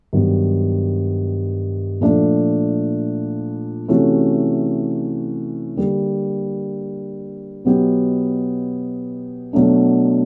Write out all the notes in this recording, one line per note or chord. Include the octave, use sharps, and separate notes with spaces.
G2 D#3 F#3 B3
A#2 F3 A3 D4
C3 E3 A3 C#4 F#4
D3 G3 A#3
B2 F#3 B3 D#4 G4
B2 F#3 A3 D4